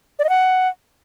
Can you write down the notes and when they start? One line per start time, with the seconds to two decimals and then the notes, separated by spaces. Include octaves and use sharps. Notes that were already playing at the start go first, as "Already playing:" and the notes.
0.19 D5
0.24 D#5
0.29 F#5